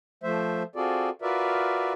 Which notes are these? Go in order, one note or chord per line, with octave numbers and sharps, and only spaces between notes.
F3 A3 C5 E5
C4 F4 F#4 G#4 A4 D5
F4 F#4 A#4 B4 D5 E5